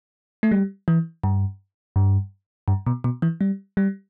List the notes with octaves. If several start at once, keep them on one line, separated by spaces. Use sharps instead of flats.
A3
G3
E3
G2
G2
G2
B2
B2
E3
G3
G3